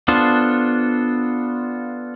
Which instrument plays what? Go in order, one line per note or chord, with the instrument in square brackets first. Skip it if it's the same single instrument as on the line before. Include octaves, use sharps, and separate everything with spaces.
[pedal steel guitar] B3 D4 F4 A4 C5